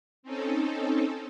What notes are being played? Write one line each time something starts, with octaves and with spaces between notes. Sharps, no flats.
C4 C#4 D#4 A4